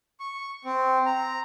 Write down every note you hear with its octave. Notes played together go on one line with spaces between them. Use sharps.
C#6
C4
A#5